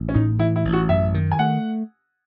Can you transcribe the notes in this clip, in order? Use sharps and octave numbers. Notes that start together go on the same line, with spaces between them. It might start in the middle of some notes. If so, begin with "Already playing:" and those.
Already playing: A1
C#4
A2 D#4
E3 E4
E4
A1
F#4
F#2 E5
D#3
G#5
A3 F#5